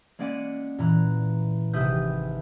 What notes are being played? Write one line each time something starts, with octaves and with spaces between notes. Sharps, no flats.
G#3 A#3 C#4 D5 F#5 D#7
A#2 E3 A#5 F#6
G#1 C3 B4 E5 D#6 G6